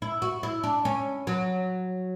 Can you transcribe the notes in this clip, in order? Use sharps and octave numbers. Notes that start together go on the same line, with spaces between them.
E4
F#4
E4
D4
C#4
F#3